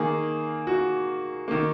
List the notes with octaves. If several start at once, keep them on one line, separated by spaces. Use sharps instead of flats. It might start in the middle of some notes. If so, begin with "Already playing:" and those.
Already playing: D#3 A#3 G#4
F#4
D#3 A#3